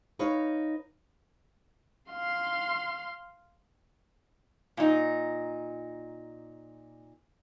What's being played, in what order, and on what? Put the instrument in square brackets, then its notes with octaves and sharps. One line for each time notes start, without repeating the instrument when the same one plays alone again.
[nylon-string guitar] D#4 B4 C#5 F5
[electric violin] F5 C6
[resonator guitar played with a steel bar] A#2 D#4